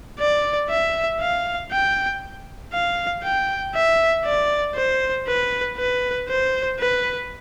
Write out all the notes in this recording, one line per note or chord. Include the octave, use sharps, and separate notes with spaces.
D5
E5
F5
G5
F5
G5
E5
D5
C5
B4
B4
C5
B4